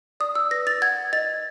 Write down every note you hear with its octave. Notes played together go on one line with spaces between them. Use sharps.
D5 D#6
E6
B4 A#6
A6
F#5 G#6
D#5 A6